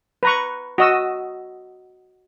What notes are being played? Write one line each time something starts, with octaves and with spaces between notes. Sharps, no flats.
B4 A#5 C#6
F#4 D#5 E6